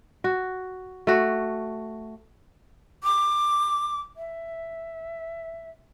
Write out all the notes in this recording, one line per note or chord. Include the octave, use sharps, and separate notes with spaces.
F#4
A3 F#4
D6
E5